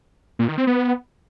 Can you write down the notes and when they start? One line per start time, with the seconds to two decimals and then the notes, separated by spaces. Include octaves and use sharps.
0.39 A#2
0.48 D#3
0.58 C4
0.67 B3